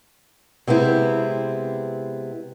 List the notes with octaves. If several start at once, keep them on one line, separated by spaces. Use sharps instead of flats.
C3 G#3 B3 C4 E4